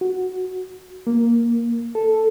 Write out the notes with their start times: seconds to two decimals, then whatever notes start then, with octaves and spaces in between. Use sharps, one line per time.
0.01 F#4
1.07 A#3
1.95 A4